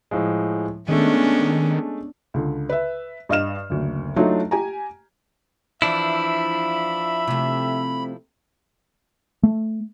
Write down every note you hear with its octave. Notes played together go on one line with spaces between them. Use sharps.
A2 F3 G#3
D#3 G#3 A3 B3 C#4 D4
C#2 D3
B4 E5
G2 D#5 F5 F6 E7
F#1 D2
F#3 A3 D4 D#4 F4
G4 G#5 A#5
E3 F3 D4 E4 E5 B5
C3 A3
A3